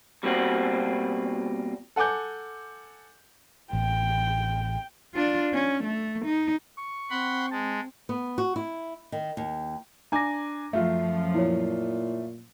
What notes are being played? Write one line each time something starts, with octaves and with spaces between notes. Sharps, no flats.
B2 G3 A#3 C4 F4 F#4
A4 F#5 G#5 D6 G6
A1 G5
D4 F4
C#4
A3
D#4
C#6
C4 F#5 B5 C6
G#3 A5
B3
F#4
E4
D#3
D#2
D4 G#5 A#5 D6 A#6
F#2 F3 A3 F4
A#2 E4 C#5